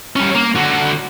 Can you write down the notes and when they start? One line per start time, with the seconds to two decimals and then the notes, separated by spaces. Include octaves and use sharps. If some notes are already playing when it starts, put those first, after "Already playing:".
0.16 G3 C#4
0.35 A#3
0.56 D3 F#4